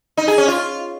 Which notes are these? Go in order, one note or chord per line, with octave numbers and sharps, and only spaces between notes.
D#4
G#4
C#4
F4